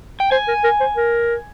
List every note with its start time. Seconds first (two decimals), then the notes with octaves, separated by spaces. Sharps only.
0.20 G5
0.32 C5 G#5
0.48 A#4
0.64 A#4
0.80 C5
0.97 A#4